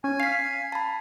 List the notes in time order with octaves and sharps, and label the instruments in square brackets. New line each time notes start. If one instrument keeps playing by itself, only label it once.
[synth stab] C#4 [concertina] G#5
[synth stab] F5 [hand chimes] B6 C7
[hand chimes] A5 B5